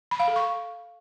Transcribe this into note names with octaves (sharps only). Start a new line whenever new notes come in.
B5
F5
A4
C#6